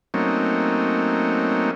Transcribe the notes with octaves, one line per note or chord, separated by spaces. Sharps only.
F#3 A3 A#3 C4 C#4 D#4